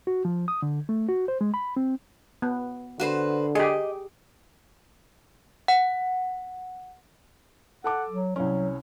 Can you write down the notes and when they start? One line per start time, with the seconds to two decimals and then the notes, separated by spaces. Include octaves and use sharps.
0.07 F#4
0.25 F3
0.48 D#6
0.62 D3
0.89 A3
1.09 F#4
1.28 C5
1.41 G#3
1.54 B5
1.76 C4
2.42 B3
3.00 D3 F#4 B4 C5
3.55 G4 G#4 D#5
5.68 F#5
7.84 A4 F#5 A5 D6
8.10 F#3
8.36 C2 F#3 C#4